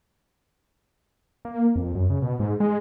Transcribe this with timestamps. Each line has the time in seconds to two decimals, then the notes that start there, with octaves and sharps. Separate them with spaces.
1.45 A#3
1.76 F2
1.95 F#2
2.10 C#3
2.22 B2
2.39 G#2
2.60 G#3